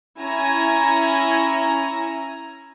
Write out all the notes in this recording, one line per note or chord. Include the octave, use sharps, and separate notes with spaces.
C#4 E4 G#5 A#5